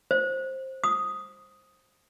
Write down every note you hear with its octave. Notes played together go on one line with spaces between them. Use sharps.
C5
D#6